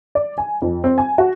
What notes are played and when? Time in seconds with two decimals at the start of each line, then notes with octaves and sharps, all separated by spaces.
0.15 D5
0.38 G#5
0.62 F2
0.84 C4
0.98 G#5
1.18 F#4